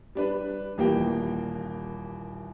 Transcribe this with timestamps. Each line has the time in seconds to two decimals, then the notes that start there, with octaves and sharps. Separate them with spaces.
0.15 G3 D4 B4
0.78 D#1 E3 A#3 G4 G5